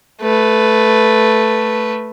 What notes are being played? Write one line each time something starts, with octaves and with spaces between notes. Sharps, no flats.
A3 B4